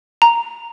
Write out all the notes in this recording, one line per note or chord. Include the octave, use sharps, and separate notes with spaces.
A#5